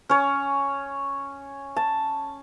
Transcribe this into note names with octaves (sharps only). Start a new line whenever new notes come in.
C#4 C#5
A5